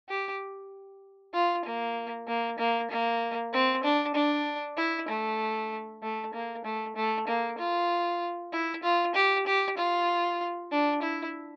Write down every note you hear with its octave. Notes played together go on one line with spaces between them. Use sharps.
G4
F4
A#3
A#3
A#3
A#3
C4
D4
D4
E4
A3
A3
A#3
A3
A3
A#3
F4
E4
F4
G4
G4
F4
D4
E4